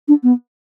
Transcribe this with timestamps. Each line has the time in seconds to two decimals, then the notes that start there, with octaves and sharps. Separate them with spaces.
0.08 D4
0.23 B3